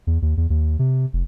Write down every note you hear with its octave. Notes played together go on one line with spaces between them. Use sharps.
E2
D#2
E2
D#2
C3
F1